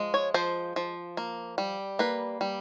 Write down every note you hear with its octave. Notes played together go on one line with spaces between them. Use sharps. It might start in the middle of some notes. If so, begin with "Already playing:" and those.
Already playing: F3 G#3
C#5
F3 C5
F3
A#3
G3
A#3 B4
G3